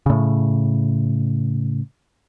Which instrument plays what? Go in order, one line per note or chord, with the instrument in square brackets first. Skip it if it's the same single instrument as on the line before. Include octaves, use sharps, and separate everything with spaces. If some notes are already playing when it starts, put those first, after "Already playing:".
[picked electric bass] A2 C#3